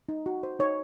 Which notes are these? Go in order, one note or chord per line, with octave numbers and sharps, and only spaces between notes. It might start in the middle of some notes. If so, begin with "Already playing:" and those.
D#4
F#4
C5
D#4 C#5